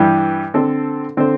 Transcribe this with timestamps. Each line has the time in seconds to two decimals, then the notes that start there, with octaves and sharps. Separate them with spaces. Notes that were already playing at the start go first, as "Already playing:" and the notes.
Already playing: G2 E3 G3
0.54 D3 C4 A4 C5
1.17 D3 C4 A4 C5